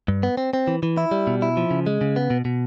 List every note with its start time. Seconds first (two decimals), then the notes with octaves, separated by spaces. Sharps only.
0.08 G2
0.23 B3
0.37 C4
0.53 C4
0.67 E3
0.83 E3
0.97 E4
1.11 G3
1.27 B2
1.42 E4
1.57 F3
1.71 C#3
1.86 G#3
2.01 C#3
2.16 B3
2.30 B2
2.45 B2